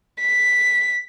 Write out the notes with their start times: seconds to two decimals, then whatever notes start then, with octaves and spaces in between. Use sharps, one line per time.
0.21 B6